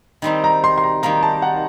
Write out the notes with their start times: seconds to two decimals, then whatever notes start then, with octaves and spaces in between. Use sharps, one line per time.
0.22 D#3 G3 C4 D#4
0.44 A#5
0.64 C6
0.78 C6
0.84 A#5
1.03 D#3 G3 A#3 A#5
1.23 A5
1.42 F#5